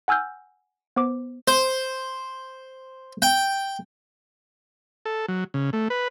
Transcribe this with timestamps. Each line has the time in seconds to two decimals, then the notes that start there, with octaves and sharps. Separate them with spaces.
0.08 F#5 G#5 E6 F6 G6
0.96 B3 C5 D6
1.48 C5
3.22 G5
5.06 A4
5.28 F#3
5.54 C#3
5.73 A3
5.90 B4